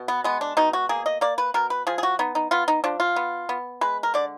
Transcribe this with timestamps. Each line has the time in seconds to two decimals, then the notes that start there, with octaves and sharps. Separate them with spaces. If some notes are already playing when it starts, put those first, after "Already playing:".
Already playing: B2
0.08 B3
0.24 G#3 B3
0.41 D4
0.57 B2 D#4
0.73 F#4
0.89 A#3 G#4
1.06 D#5
1.21 A#3 D5
1.38 B4
1.54 B2 A#4
1.70 B4
1.87 F3 G#4
1.98 G#4
2.03 F#4
2.19 B3 D#4
2.35 D#4
2.51 B3 F4
2.68 D#4
2.84 F3 D4
3.00 F4
3.16 B3
3.49 B3
3.81 G#3 B4
4.03 A#4
4.14 D3 D5